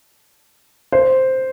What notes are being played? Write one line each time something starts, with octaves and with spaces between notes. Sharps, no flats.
C5